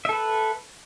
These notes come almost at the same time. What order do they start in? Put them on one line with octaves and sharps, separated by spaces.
E5 A4 B4